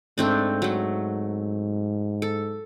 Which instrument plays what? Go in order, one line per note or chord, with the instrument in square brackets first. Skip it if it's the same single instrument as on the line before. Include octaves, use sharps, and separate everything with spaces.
[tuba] G#2 [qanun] A3 C4 D4
[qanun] F#3 A3
A4